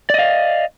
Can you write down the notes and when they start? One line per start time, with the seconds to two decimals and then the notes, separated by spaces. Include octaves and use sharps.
0.10 D5
0.14 D#5
0.18 F5